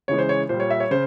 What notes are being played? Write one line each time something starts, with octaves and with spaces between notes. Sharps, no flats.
C#3 E3 G#3 C#5
C5
C#5
A#2 G3 C5
C#5
E5
C#5
C#3 C5